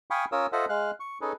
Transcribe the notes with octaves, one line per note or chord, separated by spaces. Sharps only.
F5 G5 G#5 B5 C#6 D#6
C#4 F4 A#4 C#5 D#6 E6
F4 A4 C5 D#5 E5 F#5
G#3 F5 F#6
C#6
C#4 D#4 G#4 A4 B4